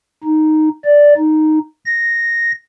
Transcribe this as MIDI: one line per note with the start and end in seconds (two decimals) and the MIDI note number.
0.24 0.69 63
0.85 1.14 74
1.17 1.59 63
1.85 2.51 94